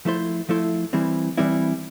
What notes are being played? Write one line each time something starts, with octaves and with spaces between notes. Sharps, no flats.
F3 A3 E4 A4 C5
F3 A3 E4 A4 C5
E3 G3 C4 E4
E3 G3 C4 E4